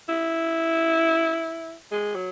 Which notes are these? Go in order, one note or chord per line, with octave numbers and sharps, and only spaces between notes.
E4
G#3
F#3